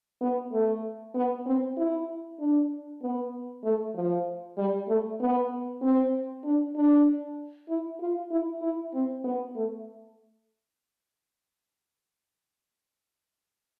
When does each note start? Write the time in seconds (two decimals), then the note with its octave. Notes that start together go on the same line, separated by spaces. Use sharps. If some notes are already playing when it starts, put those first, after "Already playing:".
0.21 B3
0.52 A3
1.14 B3
1.46 C4
1.77 E4
2.39 D4
3.02 B3
3.63 A3
3.95 F3
4.57 G3
4.88 A3
5.20 B3
5.82 C4
6.44 D4
6.75 D4
7.69 E4
8.00 F4
8.31 E4
8.62 E4
8.94 C4
9.24 B3
9.56 A3